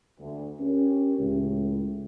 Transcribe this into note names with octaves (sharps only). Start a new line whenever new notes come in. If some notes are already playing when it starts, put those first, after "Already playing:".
D2
C#4 G4 A#4
C#2 A2